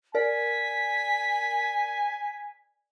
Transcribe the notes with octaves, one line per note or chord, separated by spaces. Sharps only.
A#4 D5 G#5 B6